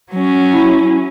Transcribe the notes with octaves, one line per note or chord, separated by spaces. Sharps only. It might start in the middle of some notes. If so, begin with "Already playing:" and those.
F#3 C#4
E4